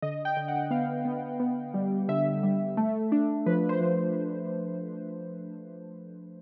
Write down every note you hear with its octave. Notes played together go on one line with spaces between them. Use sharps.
D3 D#5
G5
D3
F#5
B3 F5
B3
B3
G3
D3 E5
G3
A3
D4
F3 B4
C5
F3